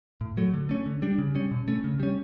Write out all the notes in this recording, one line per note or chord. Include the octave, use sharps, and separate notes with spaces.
A2
F#3 A3
D3
A3 C#4
D3
G3 D4
C#3
G3 C#4
B2
A3 C#4
C#3
G3 C#4